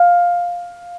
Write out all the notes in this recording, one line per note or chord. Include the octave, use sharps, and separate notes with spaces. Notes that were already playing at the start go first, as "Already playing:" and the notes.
Already playing: F5